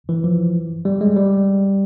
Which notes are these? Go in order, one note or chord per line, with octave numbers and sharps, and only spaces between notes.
E3
F3
G3
G#3
G3